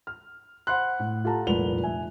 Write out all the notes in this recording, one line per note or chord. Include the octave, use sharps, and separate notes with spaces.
F6
C5 F#5 B5 C6 F#6
A2
F4 G4 A4 F#5 A5 A#5
F1 C2 A#2 B4 F7 G7
F1 E5 G#5